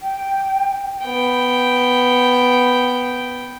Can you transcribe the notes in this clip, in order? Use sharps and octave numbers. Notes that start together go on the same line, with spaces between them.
G5
B3 G5